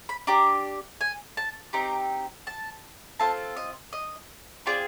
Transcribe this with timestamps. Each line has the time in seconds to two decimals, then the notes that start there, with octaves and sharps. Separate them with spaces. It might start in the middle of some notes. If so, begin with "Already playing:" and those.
0.09 B5
0.27 D4 G4 A#5
1.01 G#5
1.37 A5
1.73 C4 D#4 G4 A#5
2.47 A5
3.20 C4 F4 A4 A5
3.56 D#5
3.93 D#5
4.66 C4 F4 G#4 D5